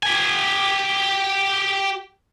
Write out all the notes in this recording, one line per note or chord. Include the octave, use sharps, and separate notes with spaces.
G4 G#5